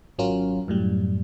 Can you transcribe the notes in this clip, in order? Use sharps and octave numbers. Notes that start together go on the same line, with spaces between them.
G#1 F#3 C#4 F4 A#4
F#2 A2 G3